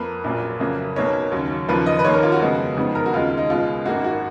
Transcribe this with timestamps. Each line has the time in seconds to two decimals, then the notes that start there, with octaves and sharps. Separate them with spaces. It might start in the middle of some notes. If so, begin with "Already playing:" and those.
Already playing: F2 A#3 B4
0.24 A#1 A#2 F#3 A#3
0.60 F2 C#3 F#3 A#3
0.96 B1 B2 A#3 C#5
1.32 D#2 C#3 F#3
1.68 D#2 C#3 F3 A#3 B4
1.86 D#5
1.99 B4
2.04 D#2 D#3 A#3 C#5
2.14 A#4
2.23 F4
2.32 F#4
2.41 F2 C#3 G#3 B3
2.77 F#1 F2 D#3 G#3 B3
2.95 A#4
3.06 F#4
3.13 D#2 C#3 G#3 F4
3.37 D#4
3.50 C#2 B2 G#3 F4
3.85 G#1 F#2 D#3 A#3 F#4
4.04 F#4